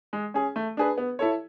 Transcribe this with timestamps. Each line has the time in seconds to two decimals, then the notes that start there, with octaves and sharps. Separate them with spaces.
0.13 G#3
0.34 C#4 G#4
0.56 A3
0.77 D4 G#4 B4
0.98 B3
1.19 E4 A4 C#5